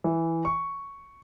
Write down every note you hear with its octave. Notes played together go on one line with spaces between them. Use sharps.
E3
C#6